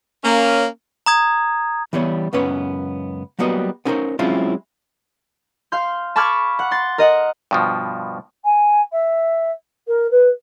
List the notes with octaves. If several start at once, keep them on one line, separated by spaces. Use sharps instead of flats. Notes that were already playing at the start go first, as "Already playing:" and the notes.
A#3 C#4
A#5 D#6 G#6
E3 G3 B3 C#5
C#2 F#2 B3 C#4 B4 C#5
F#3 G3 A#3 B3 F#4 D#5
B3 C#4 D#4 A#4 C5 C#5
F#3 G#3 C4 C#4 E4 F4
F5 C6 G6
A5 B5 C#6 D6 F6 G#6
F#5
C6 A6
A#4 D#5 F#5
G2 B2 F3
G#5
E5
A#4
B4